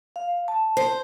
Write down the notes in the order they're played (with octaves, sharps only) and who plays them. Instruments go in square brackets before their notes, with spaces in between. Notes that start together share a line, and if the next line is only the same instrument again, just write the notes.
[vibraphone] F5
A5
[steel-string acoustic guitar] C5